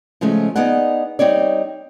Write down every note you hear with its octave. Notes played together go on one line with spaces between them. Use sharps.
C#3 F3 G#3 A3
B3 D#4 G#4 D5 F#5
G3 C4 D#4 C#5 D5